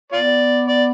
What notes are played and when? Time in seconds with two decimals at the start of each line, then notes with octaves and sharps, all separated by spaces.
0.13 B3 F4 D5
0.68 D5